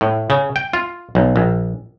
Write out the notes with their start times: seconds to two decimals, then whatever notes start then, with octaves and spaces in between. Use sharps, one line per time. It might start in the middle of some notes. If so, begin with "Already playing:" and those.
0.01 A2
0.30 C#3
0.56 G5
0.73 F4
1.15 B1
1.36 A#1